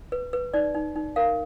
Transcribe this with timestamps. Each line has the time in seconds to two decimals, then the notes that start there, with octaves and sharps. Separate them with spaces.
0.12 B4
0.33 B4
0.53 D#4 D5
0.74 D#4
0.96 D#4
1.16 A#4 F5